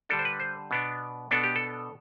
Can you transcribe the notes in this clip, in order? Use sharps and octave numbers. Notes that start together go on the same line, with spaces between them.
D3 G3 D4 A4
C5
B4
C5
B2 B3 D4
B2 B3 D4 A4
G4
A4